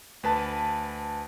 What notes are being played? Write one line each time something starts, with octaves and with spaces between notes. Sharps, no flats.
D2 B4 A5